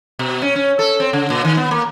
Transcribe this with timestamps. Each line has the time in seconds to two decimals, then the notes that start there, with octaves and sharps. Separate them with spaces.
0.19 B2
0.42 C#4
0.55 C#4
0.79 A4
1.00 C4
1.13 C#3
1.30 A#2
1.45 D#3
1.57 B3
1.71 A#3